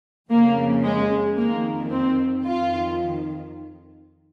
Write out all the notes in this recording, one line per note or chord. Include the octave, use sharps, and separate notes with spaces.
F2 C#3 A#3
G#3
F2 D#3 A#3
C4
F2 D#3 F4